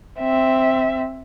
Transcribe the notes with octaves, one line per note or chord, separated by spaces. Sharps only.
C4 E5